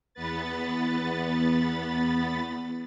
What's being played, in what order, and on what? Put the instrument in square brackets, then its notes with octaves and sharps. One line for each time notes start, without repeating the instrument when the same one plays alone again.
[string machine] E2 B3 B4 A6